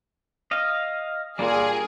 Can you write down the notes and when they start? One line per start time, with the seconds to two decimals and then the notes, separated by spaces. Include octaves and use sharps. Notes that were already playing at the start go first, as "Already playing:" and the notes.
0.51 D#5 F5
1.39 A#2 G3 D4 G#4 A#4